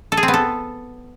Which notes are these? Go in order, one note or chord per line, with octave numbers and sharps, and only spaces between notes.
A4
G#4
C4
B3
A4